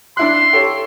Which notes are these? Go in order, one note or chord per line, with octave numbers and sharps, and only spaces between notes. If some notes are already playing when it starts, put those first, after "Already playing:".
D4 E4 C6 F#6
G4 A4 C#5